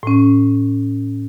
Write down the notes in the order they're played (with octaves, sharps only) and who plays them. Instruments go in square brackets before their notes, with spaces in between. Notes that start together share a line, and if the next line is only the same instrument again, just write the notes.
[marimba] A2 C#4